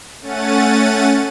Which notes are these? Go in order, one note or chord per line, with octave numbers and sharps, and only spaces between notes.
A3 C#4 F#5 A6 D#7